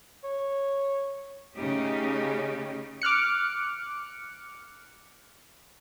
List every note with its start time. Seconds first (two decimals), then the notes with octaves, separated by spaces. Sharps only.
0.24 C#5
1.56 C#3 A3 C#4 D#4 G4
3.02 D6 F6 F#6 C#7